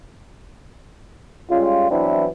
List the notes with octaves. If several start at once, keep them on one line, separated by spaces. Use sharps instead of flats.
G3 G#3 C#4 F4
E3 F#3 B3 C4 D4 E4